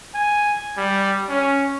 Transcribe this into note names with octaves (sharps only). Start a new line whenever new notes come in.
G#5
G3
C#4